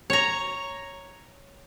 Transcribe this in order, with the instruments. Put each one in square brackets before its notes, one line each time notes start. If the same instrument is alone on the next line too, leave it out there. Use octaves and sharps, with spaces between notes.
[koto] C#5 A#5